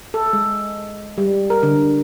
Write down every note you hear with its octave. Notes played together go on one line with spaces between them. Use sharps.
A4
G#3
G3
A#4
D3